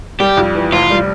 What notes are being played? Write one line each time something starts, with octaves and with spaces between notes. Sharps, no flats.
G3 G4
F2
E3
F1 F4
G3